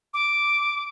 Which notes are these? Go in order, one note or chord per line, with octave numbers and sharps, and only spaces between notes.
D6